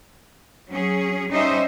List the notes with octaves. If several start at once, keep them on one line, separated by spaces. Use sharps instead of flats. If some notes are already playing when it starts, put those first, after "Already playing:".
F#3 C#4 G#4
G3 C#4 D#4 C5 D#5 E5